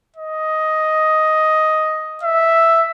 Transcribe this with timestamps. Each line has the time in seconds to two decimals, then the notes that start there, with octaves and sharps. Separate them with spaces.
0.16 D#5
2.23 E5